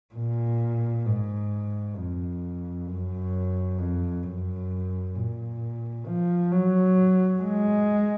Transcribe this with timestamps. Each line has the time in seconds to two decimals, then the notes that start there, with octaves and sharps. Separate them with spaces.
0.15 A#2
1.06 G#2
1.97 F2
2.88 F#2
3.78 F2
4.24 F#2
5.15 A#2
6.07 F3
6.52 F#3
7.42 G#3